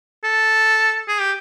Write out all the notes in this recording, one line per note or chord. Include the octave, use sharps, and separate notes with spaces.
A4
G#4
G4